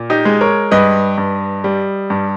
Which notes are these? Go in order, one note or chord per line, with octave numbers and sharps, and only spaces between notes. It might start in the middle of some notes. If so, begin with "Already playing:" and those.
Already playing: A#2
D#4 G4
G#3
A#4 C#5
G2 B4 D#5
G2
G3
G2